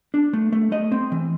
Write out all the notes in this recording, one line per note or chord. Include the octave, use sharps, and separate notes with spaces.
D4
A3
A3
A3 D#5
C4
E3